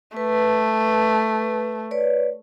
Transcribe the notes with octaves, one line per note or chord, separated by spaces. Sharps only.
A3 B4
B4 C#5 D5